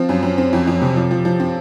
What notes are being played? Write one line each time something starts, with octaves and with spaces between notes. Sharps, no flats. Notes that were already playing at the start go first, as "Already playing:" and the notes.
Already playing: F3 C4
F#2
F#2
C4
F2
F2
C3
F3
F3
F3
C4